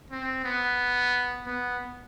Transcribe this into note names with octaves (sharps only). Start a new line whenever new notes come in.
C4
B3
B3